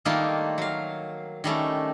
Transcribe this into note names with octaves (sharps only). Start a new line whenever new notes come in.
D#3 G3 A3 A#3 D#4 F4
F#3 F5
D#3 G3 A3 C#4